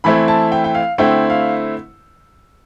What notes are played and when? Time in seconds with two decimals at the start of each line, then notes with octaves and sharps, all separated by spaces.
0.04 E3 A3 C4 E4 B5
0.28 A5
0.52 G5
0.64 G5
0.75 F5
0.98 D3 A3 C4 E4 G5
1.30 F5